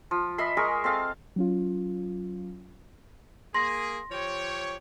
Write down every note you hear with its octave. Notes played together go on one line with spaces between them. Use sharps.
F3
D#5 E5 B5 C6
G#3 G#4 A#4 C#6
C4 A4 F5
F#3 C#4 F4
A#3 G#4 C6 A#6
F3 G4 C#5